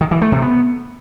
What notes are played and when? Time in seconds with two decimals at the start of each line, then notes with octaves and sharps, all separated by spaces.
0.01 D#3
0.11 E3
0.22 A3
0.32 C3
0.42 B3